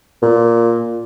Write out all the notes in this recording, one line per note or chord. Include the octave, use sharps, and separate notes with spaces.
A#2